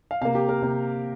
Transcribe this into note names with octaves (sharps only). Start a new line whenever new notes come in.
F5
C3 A#3 F5
G4
A#4
C3 A#3